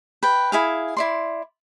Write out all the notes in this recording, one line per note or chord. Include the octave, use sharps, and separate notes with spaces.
B4 G5
E4 G#4 F5
E4 D5 C6